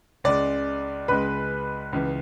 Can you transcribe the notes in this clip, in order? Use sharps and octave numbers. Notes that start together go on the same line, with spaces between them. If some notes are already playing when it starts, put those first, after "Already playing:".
C#2 C#3 G#3 D5
C#2 C#3 G#3 B4
C#2 C#3 E3